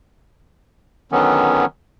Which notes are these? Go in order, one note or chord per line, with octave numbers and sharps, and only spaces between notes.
D3 D#3 F#3 B3 C#4